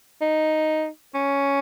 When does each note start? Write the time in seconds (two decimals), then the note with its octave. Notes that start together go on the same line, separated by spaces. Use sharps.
0.21 D#4
1.14 C#4